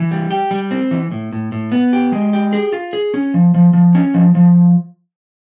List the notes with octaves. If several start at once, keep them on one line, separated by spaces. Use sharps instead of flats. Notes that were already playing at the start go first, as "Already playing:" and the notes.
Already playing: E3
G3
G4
G3
C4
E3
A2
A2
A2
B3
G4
G#3
G4
G#4
F4
G#4
C#4
F3
F3
F3
C#4
F3
F3